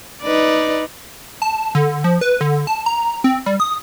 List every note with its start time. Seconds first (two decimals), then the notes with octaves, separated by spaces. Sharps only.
0.22 D#4 B4 D5
1.42 A5
1.75 D3
2.04 F3
2.21 B4
2.41 D3
2.67 A5
2.86 A#5
3.24 C4
3.46 G3
3.60 D#6